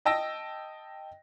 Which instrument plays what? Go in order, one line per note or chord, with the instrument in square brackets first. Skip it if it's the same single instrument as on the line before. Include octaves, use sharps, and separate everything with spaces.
[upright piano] D#5 G5 A5 E6 A#6